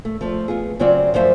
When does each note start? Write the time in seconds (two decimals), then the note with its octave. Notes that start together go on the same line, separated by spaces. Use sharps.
0.05 A3
0.21 F3 A3
0.48 B3 F4 G#4
0.79 C#3 F#3 C4 F4 D5
1.14 F#2 F3 A3 C5 E5 F5